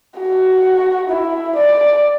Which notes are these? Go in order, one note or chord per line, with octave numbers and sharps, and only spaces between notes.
F#4
E4
D5